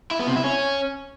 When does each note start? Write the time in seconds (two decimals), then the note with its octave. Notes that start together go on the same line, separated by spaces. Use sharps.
0.11 E4
0.19 B3
0.28 C3
0.36 E4
0.44 C#4